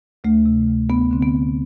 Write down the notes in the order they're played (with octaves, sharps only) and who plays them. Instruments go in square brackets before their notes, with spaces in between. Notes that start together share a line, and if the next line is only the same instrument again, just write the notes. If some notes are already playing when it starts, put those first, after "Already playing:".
[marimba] D2 A3
C3
D2
D2 B3
D3 C4
B3
D2